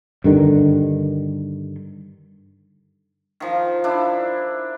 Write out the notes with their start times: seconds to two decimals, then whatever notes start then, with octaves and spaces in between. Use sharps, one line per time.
0.24 G2 D3 D#3
3.40 D#3 F3
3.84 D4 E4